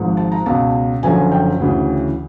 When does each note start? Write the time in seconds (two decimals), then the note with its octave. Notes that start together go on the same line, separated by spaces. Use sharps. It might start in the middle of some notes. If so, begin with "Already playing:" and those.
Already playing: G#1 G#2 F3
0.17 A5
0.32 A#5
0.46 C#2 B2 A5
1.03 F#1 F#2 D3 F3 G#5
1.32 G5
1.60 D2 C#3 E3